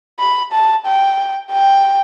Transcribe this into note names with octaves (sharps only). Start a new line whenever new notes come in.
B5
A5
G5
G5